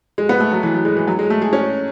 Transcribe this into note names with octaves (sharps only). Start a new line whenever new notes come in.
G#3
B3
A3
F#3
E3
F#3
G#3
E3
F#3
G#3
A3
G#4
C#4